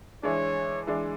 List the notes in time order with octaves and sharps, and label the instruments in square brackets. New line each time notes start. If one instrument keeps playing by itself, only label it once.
[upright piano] E3 G#3 D4 [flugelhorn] C#5
[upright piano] E3 G#3 D4